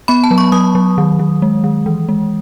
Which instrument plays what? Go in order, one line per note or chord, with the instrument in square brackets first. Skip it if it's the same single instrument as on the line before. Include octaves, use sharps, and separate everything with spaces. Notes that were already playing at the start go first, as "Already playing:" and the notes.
[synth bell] B3 B5
A5
F#3
C#6
F#3 D#6
F#3
D#3
D#3
G#3
D#3
E3
G#3